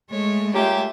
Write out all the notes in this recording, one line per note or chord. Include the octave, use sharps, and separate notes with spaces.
G#3 A3 C#5
A#3 C#4 F4 G4 E5